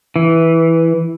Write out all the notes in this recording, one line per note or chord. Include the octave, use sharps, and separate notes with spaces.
E3